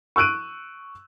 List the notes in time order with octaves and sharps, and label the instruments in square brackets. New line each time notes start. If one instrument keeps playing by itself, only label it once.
[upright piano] C#6 E6 F#6 D7 D#7